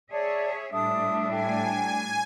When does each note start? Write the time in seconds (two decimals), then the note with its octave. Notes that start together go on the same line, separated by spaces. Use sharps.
0.11 G#4 C#5 D5 E5 A5
0.72 A2 G3 D4 A4 E5 A5 D#6
1.31 A4 G5 G#5